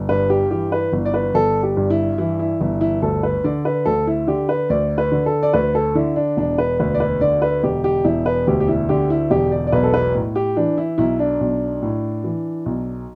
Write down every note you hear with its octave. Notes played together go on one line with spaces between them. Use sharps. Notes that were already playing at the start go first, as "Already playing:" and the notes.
Already playing: G1
G2 B4
G4
E3 G4
B4
G1
D5
B4
G1 A4
G4
G2
E4
E3 E4
E4
G1 E4
E4
D2 A4
B4
D3 D5
B4
D2 A4
E4
D3 G4
B4
D2 D5
B4
D3
A4
D5
D2 B4
A4
D3 E4
D4
E1 D4
B4
D2 B4
D5
B4
D3 D5
B4
E1 G4
G4
E1 E4
B4
D2 G4
G4
E4
D3 G4
E4
E1 G4
D5
D5
B1 B4
A4
B4
A2
G4
E3 D4
E4
B1 E4
D4
B1
A2
E3
B1